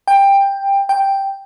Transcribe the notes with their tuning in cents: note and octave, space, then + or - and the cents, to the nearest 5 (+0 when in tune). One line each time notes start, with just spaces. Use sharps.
G5 +15
G5 +0